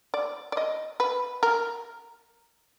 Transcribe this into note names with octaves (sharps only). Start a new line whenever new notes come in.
D5
D5
D#5
B4
A#4